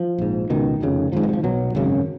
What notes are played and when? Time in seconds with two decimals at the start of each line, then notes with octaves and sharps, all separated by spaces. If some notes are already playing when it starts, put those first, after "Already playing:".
Already playing: F3
0.18 A#1 G#2
0.50 C#2 B2 D#3
0.81 F1 F2 C#3
1.12 G#1 G#2 F3
1.23 D#3
1.29 F#3
1.33 F3
1.44 B1 B2 F#3
1.75 G#1 F#2 C#3